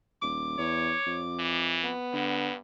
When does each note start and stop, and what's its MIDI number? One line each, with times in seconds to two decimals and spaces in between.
0.22 0.57 27
0.22 1.73 86
0.59 0.94 40
0.59 1.24 73
1.06 1.94 41
1.39 1.89 52
1.83 2.56 59
2.13 2.55 43
2.13 2.49 50